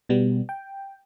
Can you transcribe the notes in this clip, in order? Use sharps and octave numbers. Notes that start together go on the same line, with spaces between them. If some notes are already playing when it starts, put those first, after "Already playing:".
B2 G3 B3
G5